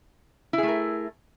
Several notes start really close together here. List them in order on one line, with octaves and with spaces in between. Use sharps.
E4 G#4 A3 A#4